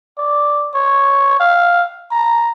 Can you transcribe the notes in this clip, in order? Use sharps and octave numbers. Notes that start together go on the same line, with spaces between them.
D5
C#5
F5
A#5